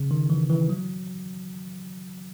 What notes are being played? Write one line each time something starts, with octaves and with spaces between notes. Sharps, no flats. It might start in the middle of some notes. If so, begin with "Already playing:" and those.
Already playing: C#3
D#3
E3
E3
F#3